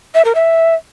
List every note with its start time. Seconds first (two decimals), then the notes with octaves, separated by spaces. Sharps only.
0.15 E5
0.25 A#4
0.35 E5